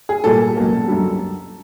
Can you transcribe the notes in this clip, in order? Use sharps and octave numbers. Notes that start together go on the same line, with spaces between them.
G#4
A#2 G3 A#3 A4
C#2 B2 F#3 A#3
F#2 D3 G3